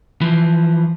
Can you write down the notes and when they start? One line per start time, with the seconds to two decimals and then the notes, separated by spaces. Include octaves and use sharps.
0.21 E3 F3